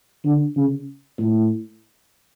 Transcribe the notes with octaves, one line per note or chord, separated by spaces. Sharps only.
D3
C#3
A2